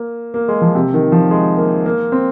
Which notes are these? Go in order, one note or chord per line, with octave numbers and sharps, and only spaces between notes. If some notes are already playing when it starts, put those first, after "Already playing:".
Already playing: A#3
A#3
G#3
F3
C3
D#3
F3
G#3
A#3
A#3
C4